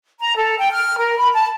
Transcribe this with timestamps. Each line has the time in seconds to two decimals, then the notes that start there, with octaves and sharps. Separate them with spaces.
0.20 A#5
0.37 A4
0.59 G5
0.71 F6
0.98 A#4
1.18 B5
1.33 A5